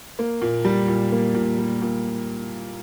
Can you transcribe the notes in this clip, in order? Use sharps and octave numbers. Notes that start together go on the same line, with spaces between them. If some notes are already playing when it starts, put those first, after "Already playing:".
A#3
A#2
G3
A#2
A#3
A#2
G3
A#2